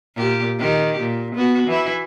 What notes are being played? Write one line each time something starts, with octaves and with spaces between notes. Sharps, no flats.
A#2 G4
D#3 G4
A#2
B3 F#4
E3 E4